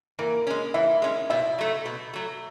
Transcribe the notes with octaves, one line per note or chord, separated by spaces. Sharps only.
E3 A#3 A#4
G#3 C#4
E3 E4 E5
G#3 C#4
B2 E4 E5
F#3 A3
B2
F#3 A3